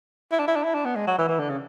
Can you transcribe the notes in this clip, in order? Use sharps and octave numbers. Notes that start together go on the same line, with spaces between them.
E4
D4
E4
D4
E4
D4
B3
G#3
F#3
E3
E3
D3
C#3